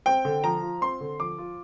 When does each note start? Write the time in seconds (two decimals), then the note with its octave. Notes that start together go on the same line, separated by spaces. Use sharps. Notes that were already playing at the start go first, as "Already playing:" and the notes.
0.06 C4 G5
0.25 D3
0.44 F3 A#5
0.62 F4
0.81 C4 C6
1.00 D3
1.20 F3 D6
1.38 F4